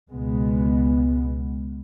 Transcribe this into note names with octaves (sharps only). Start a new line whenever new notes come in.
C#2 B2 G#3 B3